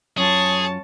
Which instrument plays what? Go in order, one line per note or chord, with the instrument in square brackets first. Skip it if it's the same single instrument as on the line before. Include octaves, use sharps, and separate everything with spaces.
[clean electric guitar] F#2 F4 [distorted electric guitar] G#4 [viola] C#5 A5